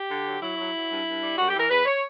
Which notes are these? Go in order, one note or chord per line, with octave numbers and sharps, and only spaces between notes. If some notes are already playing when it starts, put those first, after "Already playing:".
Already playing: G4
D3
F#3
F#3 E4
F#3
F#3
G2
G2
G3
F#2 F#4
G4
E3
A#4
E2 B4
C#5